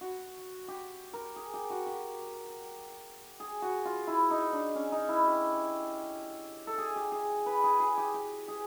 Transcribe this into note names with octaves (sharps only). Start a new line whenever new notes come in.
F#4
G4
A#4
G#4
G4
F#4
G4
G#4
F#4
F4
E4
D#4
D4
C#4
D#4
E4
G4
A4
G#4
G4
G#4
B4
G#4
G#4
G4
G4
G#4